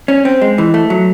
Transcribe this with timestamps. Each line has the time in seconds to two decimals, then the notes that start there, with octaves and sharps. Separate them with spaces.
0.08 C#4
0.25 C4
0.42 G#3
0.58 E3
0.74 A3
0.90 F#3